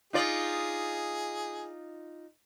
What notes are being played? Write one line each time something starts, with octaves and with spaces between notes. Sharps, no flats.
D#4 F4 G#4 D5